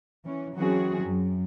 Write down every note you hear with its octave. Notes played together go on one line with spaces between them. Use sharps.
E3 C#4
E3 F#3 C4 C#4 F#4 G#4
F#2